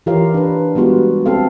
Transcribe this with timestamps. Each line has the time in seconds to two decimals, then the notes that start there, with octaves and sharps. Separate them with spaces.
0.06 E3 F4 G4 A#4 C#5 F5
0.34 D4 B4
0.75 G3 G#3 B3 F4 F#4
1.26 C4 A4 F5